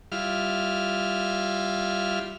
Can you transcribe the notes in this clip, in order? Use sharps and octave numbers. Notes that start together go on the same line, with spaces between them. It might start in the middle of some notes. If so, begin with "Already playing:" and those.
G3 E4 F4 F6